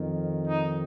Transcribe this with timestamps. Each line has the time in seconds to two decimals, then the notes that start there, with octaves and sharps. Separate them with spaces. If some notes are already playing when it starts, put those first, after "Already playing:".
Already playing: F2 D#3
0.46 D#4